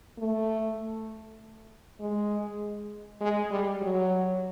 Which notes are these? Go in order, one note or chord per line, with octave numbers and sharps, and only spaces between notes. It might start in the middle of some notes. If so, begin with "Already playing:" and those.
A3
G#3
G#3
G3
F#3